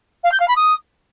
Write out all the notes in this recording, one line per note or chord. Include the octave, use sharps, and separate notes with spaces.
F5
G6
F5
B5
D#6